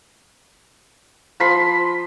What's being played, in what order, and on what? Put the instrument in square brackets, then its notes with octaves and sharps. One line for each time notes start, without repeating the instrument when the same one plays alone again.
[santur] F3 B5 C6